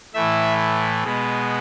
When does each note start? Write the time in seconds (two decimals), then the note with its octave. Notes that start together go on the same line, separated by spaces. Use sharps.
0.14 A2 E3 A3 E5
1.03 B2 G#3 B3